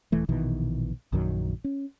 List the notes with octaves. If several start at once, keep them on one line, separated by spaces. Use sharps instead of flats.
D#1 E3 A3
A#1 B2 D#3 E3
A#1 F#2 D#3 F#3
C#4